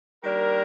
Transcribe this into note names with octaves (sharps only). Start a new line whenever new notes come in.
D#3 G3 A#3 D4 A#4